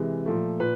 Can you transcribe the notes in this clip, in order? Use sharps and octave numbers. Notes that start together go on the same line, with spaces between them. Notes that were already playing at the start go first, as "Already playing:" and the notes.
Already playing: C3 E3 G#3
A#2 F3 A3
A#2 B4